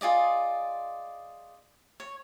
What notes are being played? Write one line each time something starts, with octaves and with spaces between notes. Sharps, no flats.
F4 G#4 D5 D#5
C#5